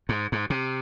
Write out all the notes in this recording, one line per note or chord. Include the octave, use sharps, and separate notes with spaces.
G#2
G#2
C3